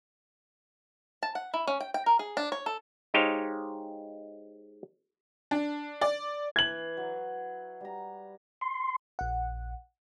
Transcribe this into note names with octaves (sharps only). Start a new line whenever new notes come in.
A5
F#5
E4
C#4
G5
G5
A#4
G#4
D4
C#5
A4
G#3 D#4 G4 C5 C#5 F5
D4
D5
E3 G#6 F#7
F#3
G3 A#5
C6
A#1 F#5